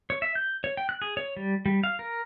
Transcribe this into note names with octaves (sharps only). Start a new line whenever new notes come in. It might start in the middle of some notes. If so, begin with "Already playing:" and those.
C#5
E5
G6
C#5
G5
F#6
G#4
C#5
G3
G3
F5
A#4